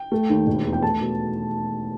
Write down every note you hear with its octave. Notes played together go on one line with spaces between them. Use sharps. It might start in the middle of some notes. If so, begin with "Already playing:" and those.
Already playing: G5
A3
D#2
E1
E2
G5
A3 A5
B2